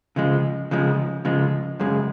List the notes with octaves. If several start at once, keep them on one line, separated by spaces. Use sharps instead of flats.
C#3 F3 G#3
C#3 F3 G#3
C#3 F3 G#3
F#2 C#3 G#3